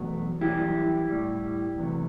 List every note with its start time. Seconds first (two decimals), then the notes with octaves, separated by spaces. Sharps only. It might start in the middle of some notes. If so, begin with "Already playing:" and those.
Already playing: E2 B2 F#3 A3
0.41 F#2 E3 G3 E4 G4
1.09 A2 G3
1.78 E2 C3 F#3 A3